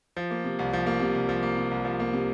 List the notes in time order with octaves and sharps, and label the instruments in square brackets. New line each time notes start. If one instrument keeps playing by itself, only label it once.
[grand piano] F3
A#3
C3
C2
F3
A#3
C3
C2
F3
A#3
C3
C2
F3
A#3
C3